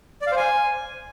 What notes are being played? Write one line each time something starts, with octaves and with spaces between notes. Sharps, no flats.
D5
F5
C5
G#5